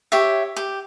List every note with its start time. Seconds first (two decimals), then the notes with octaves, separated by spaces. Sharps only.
0.12 G4 C#5 E5
0.56 G4